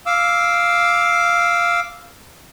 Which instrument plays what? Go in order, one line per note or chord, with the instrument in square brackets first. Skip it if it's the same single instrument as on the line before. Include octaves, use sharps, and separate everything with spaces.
[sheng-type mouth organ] F5 D6 E6